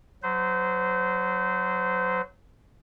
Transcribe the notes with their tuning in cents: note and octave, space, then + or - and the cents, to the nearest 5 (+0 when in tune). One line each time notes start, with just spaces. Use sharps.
F#3 +0 C5 -30